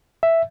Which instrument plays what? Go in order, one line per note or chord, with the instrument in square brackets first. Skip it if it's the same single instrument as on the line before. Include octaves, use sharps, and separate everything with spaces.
[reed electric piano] E5